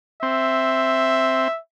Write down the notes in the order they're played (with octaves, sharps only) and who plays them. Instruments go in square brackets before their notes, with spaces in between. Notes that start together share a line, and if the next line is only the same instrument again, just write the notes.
[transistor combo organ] C4 [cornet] E5